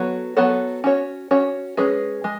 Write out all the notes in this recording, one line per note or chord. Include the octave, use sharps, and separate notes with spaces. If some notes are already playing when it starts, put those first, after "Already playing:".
Already playing: F#3 B3 F#4 A4 C#5
F#3 B3 F#4 A4 C#5
C#4 F#4 C#5
C#4 F#4 C#5
G#3 C#4 G#4 B4
G#3